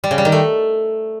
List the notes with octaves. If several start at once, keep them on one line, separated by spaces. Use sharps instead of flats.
G3
C#3
G3
D#3
A3